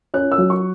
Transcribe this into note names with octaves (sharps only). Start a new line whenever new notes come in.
C#4 F#6
E6
F#3
C#6